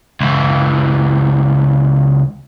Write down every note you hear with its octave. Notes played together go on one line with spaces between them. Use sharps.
C#2 E3